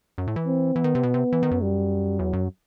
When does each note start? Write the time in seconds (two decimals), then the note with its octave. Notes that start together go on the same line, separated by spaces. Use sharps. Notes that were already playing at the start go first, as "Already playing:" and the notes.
0.18 F#2
0.27 A2
0.36 E3
0.46 C4
0.75 E3 B3
0.84 D#3
0.95 C3
1.03 B2
1.14 C3
1.32 E3
1.43 D#3
1.51 F#2
1.61 G3
2.19 E2 F#3
2.33 F#2